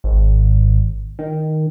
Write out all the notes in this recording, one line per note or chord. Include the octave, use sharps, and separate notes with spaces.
G#1
D#3